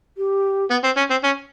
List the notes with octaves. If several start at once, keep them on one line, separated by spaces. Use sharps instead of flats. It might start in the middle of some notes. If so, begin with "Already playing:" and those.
G4
B3
C4
C#4
C4
C#4